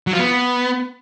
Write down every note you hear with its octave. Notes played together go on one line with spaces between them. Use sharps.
F#3
F4
B3